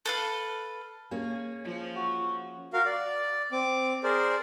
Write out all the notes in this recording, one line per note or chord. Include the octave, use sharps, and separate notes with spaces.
A4 B4 F5
A#3 C#4 G#4
F3
F#4
F#4 A#4 F5
D5
C4 D6
G#4 A#4 C5 D5